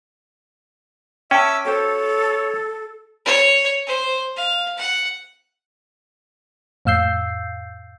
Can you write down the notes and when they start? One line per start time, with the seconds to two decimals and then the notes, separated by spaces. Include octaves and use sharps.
1.31 C#4 E5 G5 A5 D6 E6
1.65 F#4 A4 C5 C#5
3.25 C#5
3.87 C5
4.36 F5
4.78 F#5
6.85 F2 A2 F5 E6 G6 C7